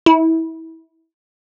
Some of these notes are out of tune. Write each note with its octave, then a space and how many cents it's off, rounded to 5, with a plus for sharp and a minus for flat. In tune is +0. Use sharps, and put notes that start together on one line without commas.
E4 -25